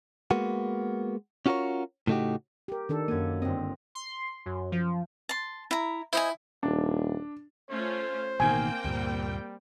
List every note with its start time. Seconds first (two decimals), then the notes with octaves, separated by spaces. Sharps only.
0.31 G#3 A#3 B3 F#4
1.46 C#4 F4 F#4 G#4 A#4 C#5
2.07 A2 C#3 A3 D#4 F#4 G4
2.68 G4 A#4
2.89 D#3 D4 A4
3.08 F#2 A#3 G#6 D#7
3.42 G1 C4 D#5
3.95 C6
4.46 F#2
4.72 F3
5.29 A5 C6
5.71 E4 A#5
6.13 E4 C5 D#5 G#5
6.63 D#1 D4
7.70 A3 C#4 F4 C5
8.40 A1 B2 D#3 A#3 C4 G5 G#5
8.84 D2 G2 A#2 G3